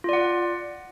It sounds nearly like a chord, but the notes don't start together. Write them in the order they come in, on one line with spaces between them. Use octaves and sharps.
F4 D5 F#5